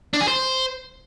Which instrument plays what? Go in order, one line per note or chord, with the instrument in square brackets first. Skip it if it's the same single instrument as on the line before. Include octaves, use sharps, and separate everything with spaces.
[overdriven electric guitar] D4
G#4
C5